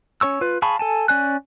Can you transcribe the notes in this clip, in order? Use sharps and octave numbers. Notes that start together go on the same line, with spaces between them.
C#4 C#5 C#6 E6
F4 B4
G#4 F5 A5 B5 C#6
A4 G#5 A5
C#4 D5 G#5 F#6